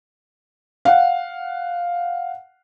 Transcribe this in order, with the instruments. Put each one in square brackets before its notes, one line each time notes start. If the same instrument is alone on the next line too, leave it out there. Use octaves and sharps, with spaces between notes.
[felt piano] F5 F#5